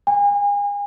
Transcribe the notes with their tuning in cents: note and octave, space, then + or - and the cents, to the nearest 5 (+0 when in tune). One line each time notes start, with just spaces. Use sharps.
G#5 -35